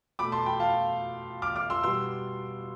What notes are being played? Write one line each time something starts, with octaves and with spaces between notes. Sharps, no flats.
B2 A3 B5 D6
A5 C6
G5 B5
F5 A5
D6 F6
D6 F6
C6 E6
B2 G3 B3 C6 E6